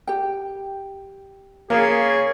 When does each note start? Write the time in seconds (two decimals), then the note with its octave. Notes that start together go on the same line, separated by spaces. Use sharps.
0.07 G4 G5
1.70 C#3 A#3 G#4